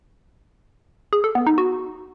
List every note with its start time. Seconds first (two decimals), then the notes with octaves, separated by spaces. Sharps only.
1.13 G#4
1.24 A4
1.35 B3
1.47 D#4
1.58 F#4